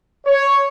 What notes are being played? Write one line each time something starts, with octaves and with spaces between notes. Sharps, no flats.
C#5